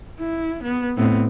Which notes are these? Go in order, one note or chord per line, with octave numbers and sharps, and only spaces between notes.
E4
B3
A2 B3 C4